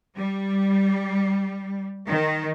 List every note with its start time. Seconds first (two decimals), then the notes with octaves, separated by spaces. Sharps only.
0.16 G3
2.08 D#3